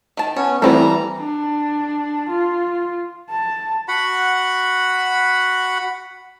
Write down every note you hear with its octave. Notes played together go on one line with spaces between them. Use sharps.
D#3 A5
B3 C#4 C#5
E3 G3 A3 B3 C4 E4 A4 A#5
D4
F4
A5
F#4 F#5 B5